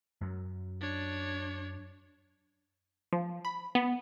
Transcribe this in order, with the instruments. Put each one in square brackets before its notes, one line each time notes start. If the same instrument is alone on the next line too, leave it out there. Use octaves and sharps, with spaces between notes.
[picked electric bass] F#2 F#3
[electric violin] D4 C#5
[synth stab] F3
B5
B3